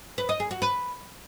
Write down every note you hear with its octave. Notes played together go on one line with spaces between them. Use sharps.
B4
D#5
G#4
F#4
B4